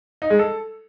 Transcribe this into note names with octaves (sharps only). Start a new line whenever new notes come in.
D#4
G#3
A4